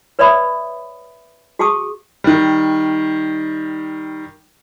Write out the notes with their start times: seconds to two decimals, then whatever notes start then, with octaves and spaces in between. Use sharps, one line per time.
0.19 B4 C#5 D5 E5 B5 D#6
1.59 F#4 G#4 A5 C#6 D#6
2.24 D#3 G3